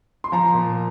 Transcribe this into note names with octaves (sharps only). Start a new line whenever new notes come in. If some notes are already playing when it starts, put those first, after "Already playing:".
C6
F3 A#5
A#2